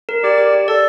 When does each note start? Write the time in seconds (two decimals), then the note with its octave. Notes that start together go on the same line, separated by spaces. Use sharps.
0.09 A#4
0.23 G4 D5
0.38 G4
0.53 G4
0.68 A4 D5